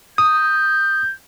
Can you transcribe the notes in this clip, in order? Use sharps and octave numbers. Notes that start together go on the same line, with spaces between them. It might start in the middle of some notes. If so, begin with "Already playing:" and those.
D#6 G6